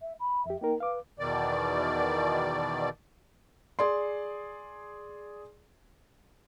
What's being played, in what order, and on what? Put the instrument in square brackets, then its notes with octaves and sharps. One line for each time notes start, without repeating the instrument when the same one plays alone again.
[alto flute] E5
B5
[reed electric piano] F2 G4 [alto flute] E5
[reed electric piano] A#3 D#4 A#4 [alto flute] G5
[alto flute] B4 [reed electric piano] F5 D6
[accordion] E2 B2 D#3 D5
[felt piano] G#4 D5 C6